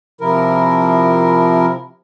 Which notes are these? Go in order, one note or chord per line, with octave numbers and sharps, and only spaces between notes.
C3 F3 E4 A#4